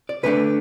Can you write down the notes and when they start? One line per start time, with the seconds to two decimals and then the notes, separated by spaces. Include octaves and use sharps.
0.09 D5
0.23 D2 D3 A3 D4 B4